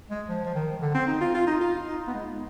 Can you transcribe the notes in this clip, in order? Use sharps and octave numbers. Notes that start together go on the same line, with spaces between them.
G#3
F3
F3
D#3
D3
C4
D#4
F4
F4
D#4
F4
D#4
B3
G#3